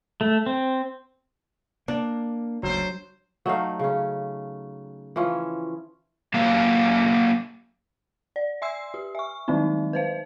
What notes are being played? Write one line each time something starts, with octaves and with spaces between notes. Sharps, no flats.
A3
C4
A#3 D4
F#1 D2 F#3 C5
F#3 A3 D#4 F5
C#3 C#4
E3 F3 C#4
F#3 A#3 G4 F5
D5
E5 C6 E6 C7
G4
E5 C#6
D#3 F#3 G#3 C4 D#4
B4 C5 F5